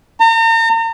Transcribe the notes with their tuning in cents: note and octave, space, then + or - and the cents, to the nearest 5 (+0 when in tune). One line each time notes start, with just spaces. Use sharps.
A#5 -40